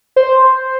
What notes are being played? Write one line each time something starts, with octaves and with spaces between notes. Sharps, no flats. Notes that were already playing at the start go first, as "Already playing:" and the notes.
C5